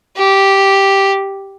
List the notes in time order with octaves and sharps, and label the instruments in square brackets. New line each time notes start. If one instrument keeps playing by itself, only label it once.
[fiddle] G4